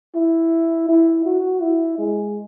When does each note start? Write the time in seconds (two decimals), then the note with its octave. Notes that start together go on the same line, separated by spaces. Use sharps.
0.15 E4
0.88 E4
1.25 F#4
1.62 E4
1.98 G#3